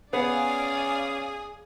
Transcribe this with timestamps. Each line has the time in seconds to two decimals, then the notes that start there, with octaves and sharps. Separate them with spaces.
0.13 B3 C#4 G#4 D5 F5 G#5